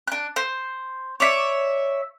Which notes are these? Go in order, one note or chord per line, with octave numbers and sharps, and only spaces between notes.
D4 F#6
C5
C#5 D5 E5